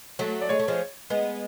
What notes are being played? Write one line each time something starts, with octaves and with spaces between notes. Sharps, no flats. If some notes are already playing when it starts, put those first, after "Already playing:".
F#3 A3
D5
G#3 C#5
A3
F3 G#3
G#3 B3